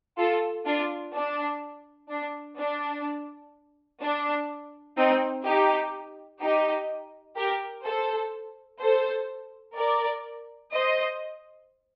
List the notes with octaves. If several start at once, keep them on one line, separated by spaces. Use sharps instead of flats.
F4 A4
D4 F4
D4
D4
D4
D4
C4 D#4
D#4 G4
D#4 G4
G4 A#4
A4 C5
A4 C5
A#4 D5
C5 D#5